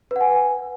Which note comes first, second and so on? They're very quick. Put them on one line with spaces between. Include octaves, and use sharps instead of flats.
B4 F#5 G#5